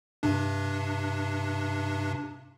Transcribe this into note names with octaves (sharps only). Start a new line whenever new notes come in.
G2 C3 D4